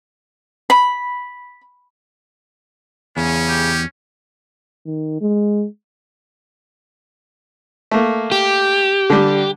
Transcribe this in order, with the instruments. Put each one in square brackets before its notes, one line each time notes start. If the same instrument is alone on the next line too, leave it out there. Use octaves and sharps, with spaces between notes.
[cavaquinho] B5
[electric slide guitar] E2 [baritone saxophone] C#3 [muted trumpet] C#4
[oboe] G4
[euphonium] D#3
G#3
[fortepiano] A3 A#3
[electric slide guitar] G4
[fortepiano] D3 G3